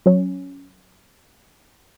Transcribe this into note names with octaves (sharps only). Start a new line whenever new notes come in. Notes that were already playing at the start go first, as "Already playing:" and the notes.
F#3 C#4